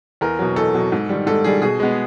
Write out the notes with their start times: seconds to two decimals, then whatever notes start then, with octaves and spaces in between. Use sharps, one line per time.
0.21 E2 A#4
0.39 B2 F#3
0.56 E2 A4
0.75 B2 F#3
0.92 G#2
1.09 D#3 G3
1.27 G#2 A4
1.44 D#3 G3 G#4
1.62 B2 G#4
1.80 G#3 B3